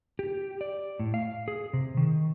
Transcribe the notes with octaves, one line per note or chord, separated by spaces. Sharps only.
G4
D5
A2
F5
G#4
C3
D#3